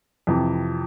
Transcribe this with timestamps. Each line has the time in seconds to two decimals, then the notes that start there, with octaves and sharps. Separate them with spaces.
0.27 F2 C3 E3